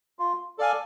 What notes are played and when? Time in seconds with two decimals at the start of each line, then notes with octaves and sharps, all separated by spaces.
0.19 F4
0.58 A4 D5 F5 G#5